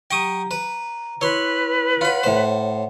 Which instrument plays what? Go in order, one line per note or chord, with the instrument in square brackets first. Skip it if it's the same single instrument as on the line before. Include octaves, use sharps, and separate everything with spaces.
[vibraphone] F#3 G4 A#5 [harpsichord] G5 C#6 D#6
[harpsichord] B4 [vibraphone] A#5
[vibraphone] E4 [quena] B4 [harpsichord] C#5 C6
[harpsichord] F4 B5 [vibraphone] C#5 F#5
[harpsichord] A2 C5